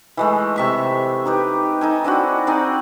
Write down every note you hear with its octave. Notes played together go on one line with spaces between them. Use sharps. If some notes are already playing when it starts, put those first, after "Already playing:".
E3 G#3 A3
C3 E5 C#6
D#4 G4 B4
D#4 A4 G#5
C4 D4 E4 F#4
C4 D#4 G#4 D5